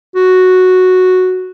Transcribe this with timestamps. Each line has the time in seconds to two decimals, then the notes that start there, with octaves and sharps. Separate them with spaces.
0.16 F#4